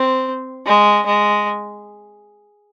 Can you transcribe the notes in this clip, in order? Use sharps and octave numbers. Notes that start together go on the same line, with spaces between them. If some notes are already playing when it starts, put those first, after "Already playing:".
Already playing: C4
G#3
G#3